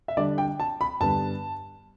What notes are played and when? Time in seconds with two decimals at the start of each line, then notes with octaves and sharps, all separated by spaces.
0.08 E5
0.17 D3 G3 D4 D5
0.38 G5
0.60 A5
0.81 B5
1.00 G2 D3 G3 B3 A5